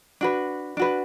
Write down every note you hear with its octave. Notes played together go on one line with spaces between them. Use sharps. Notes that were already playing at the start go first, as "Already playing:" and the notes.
D4 F#4 B4
D4 F#4 B4